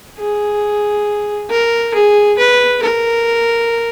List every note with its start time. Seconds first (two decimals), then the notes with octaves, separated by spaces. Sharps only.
0.19 G#4
1.50 A#4
1.94 G#4
2.38 B4
2.82 A#4